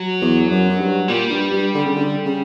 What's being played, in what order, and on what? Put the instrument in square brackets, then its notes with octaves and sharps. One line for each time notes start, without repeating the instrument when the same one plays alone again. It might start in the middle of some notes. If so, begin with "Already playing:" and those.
Already playing: [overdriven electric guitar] F#3
[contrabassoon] E2
F#2
F#2
G2
[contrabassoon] A#2 [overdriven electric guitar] G3
[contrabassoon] G2
G2
D3
C#3
D3
C#3